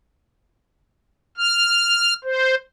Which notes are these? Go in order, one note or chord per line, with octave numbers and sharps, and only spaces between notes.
F6
C5